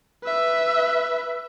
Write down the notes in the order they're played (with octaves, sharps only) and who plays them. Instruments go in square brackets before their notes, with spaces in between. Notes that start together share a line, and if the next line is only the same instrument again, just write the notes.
[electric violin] B4 E5